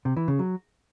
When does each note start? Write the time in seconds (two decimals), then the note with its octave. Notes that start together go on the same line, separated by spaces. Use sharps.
0.05 C3
0.17 E3
0.28 C#3
0.39 F#3